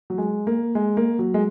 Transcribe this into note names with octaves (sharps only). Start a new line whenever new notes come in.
F#3
G#3
A#3
G#3
A#3
F#3
G#3